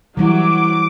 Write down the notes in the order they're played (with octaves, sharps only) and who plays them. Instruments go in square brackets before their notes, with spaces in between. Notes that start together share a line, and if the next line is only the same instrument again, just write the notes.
[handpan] E3 G3 E4 [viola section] F#3 [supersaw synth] D6